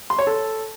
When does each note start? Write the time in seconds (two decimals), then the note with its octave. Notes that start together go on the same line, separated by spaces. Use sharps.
0.10 C6
0.18 C#5
0.27 A4